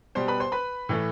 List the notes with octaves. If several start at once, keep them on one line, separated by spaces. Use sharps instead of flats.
B2 G3 C5 C6
B4 B5
C5 C6
B4 B5
A2 E3 A3